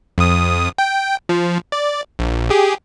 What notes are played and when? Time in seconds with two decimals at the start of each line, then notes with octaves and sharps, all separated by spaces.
0.18 F2 D#6
0.78 G5
1.29 F3
1.72 D5
2.19 A#1
2.50 G4 G#4